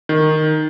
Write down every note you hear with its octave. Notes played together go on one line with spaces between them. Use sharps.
D#3